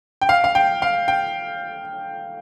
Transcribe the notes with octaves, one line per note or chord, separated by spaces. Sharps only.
G5
F5
F5
G5
F5
G5